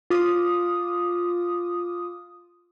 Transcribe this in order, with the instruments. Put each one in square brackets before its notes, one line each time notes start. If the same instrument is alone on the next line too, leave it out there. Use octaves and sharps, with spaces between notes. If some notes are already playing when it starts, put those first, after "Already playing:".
[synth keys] F4 D6 D#6